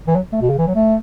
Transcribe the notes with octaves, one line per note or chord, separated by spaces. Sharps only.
E3
F#3
A3
B2
C#3
E3
F#3
A3